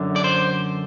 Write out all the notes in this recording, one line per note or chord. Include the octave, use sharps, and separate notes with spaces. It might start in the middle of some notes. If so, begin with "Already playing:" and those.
Already playing: F#2 D3
D5
C5